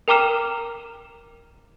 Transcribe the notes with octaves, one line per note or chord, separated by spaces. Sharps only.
A#4 G5 A#5 D6 F6 E7